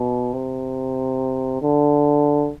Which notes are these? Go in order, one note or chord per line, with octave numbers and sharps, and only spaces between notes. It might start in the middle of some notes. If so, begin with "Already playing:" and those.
Already playing: B2
C3
D3